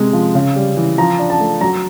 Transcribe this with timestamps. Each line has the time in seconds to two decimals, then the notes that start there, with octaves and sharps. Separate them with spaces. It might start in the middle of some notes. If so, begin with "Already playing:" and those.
Already playing: C3 G#3
0.13 F3
0.35 C#3
0.56 G3
0.77 E3
0.98 F3 A#5
1.19 D4
1.30 A5
1.40 A3
1.61 F#3 A#5